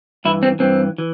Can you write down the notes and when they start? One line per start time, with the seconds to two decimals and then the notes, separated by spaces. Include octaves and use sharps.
0.25 G2 E3 E4
0.43 C4
0.60 G2 E3 C4
0.98 E3